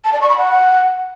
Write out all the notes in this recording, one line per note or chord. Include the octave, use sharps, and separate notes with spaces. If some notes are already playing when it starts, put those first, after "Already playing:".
A5
D5
C#6
B5
F#5